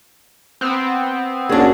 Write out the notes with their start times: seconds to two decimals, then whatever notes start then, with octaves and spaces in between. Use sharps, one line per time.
0.61 B3 C4
1.49 A#3 C#4 D4 F#4 G#4